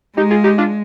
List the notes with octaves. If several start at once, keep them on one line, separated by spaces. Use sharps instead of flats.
G#3 D#4 G4
F4 G#4
D#4 G4
D4 F4